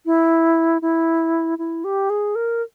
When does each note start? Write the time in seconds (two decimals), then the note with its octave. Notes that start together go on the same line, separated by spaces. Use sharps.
0.06 E4
0.82 E4
1.58 E4
1.84 G4
2.10 G#4
2.35 A#4